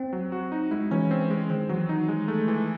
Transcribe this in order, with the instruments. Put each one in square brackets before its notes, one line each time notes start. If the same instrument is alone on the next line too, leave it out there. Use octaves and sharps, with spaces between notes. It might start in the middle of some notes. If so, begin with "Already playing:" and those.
Already playing: [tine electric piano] C4
[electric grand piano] F#3
F#4
D#4
[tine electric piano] G#3 [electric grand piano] E4
[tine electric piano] E3 [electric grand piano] C#4
[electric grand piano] C4
G#3
[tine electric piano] D#3 [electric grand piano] C4
[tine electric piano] E3 [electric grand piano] F#3
[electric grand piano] D#4
G#3
A3
E3